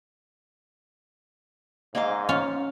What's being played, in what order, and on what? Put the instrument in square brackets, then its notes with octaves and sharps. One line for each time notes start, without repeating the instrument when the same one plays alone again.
[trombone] G#2 [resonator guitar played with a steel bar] A#3 D#5 F5
[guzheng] C#4 F4